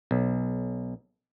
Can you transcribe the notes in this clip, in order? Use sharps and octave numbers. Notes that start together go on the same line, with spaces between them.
B1